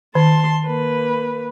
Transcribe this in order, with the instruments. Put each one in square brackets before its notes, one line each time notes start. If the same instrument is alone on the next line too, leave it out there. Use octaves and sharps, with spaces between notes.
[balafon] D#3 [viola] A5 C6
[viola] A#3 B4